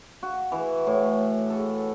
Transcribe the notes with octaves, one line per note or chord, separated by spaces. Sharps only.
F#4
E3
A2
A4